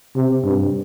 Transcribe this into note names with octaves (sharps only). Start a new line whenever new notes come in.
C3
G2